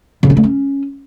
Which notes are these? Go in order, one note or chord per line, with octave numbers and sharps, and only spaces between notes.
C#3
C#4
A3
C#4